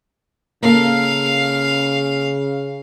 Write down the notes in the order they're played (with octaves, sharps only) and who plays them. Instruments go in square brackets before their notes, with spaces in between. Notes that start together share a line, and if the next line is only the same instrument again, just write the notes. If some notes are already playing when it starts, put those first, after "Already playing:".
[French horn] C#3 [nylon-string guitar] A#3 A4 [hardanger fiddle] F5